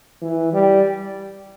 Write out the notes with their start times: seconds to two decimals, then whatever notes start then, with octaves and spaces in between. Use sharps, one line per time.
0.22 E3
0.53 G3